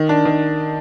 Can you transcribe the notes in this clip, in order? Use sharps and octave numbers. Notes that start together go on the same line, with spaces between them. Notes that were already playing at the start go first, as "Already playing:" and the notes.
Already playing: D#3
D4
D#3